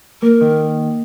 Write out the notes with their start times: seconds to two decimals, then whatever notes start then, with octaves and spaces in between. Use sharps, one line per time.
0.22 A#3 A#4
0.41 D#3